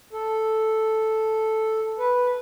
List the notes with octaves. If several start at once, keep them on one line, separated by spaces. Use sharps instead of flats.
A4
B4